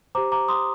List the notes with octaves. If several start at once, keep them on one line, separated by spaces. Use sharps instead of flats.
G4 C5 A#5 D6
A#5 D6
C6 D#6